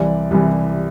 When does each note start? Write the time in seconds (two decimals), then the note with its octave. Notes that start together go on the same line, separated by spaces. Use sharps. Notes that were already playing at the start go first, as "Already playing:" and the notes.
Already playing: C2 C3 E3 D5
0.31 C2 C3 E3